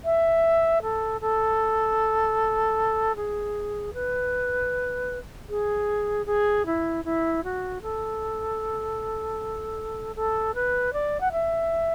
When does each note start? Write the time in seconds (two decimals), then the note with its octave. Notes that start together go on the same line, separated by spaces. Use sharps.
0.04 E5
0.82 A4
1.21 A4
3.16 G#4
3.94 B4
5.49 G#4
6.26 G#4
6.66 E4
7.05 E4
7.44 F#4
7.82 A4
10.16 A4
10.55 B4
10.93 D5
11.21 F#5
11.32 E5